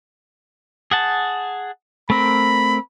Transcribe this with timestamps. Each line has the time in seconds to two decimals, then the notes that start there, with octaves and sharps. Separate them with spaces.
0.91 G#4 F#5 A5
2.10 A3 C4 A#4 B5